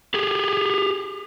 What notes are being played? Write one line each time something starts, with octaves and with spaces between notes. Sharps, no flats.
G4 G#4